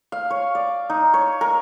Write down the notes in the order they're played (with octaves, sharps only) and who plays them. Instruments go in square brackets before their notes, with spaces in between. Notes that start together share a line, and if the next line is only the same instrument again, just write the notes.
[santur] F5
C#5
D5
D#4
C#5
A#4